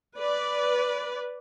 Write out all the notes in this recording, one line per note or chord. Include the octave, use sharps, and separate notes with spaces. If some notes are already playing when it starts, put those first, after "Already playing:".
B4 D5